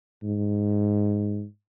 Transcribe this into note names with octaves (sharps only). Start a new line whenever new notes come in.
G#2